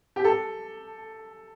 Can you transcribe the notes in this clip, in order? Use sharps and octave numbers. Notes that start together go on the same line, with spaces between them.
G4
A4